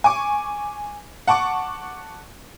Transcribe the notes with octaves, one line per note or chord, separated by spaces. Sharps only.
G#5 C#6 D6
F#5 A5 C#6 D6